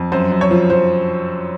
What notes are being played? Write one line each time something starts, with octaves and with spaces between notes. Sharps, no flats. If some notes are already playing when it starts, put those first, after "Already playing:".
Already playing: F2
F#2 C5
F#2
C#5
F3
F3 C5